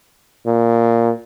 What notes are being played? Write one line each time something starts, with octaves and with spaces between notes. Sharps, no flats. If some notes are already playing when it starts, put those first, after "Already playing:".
A#2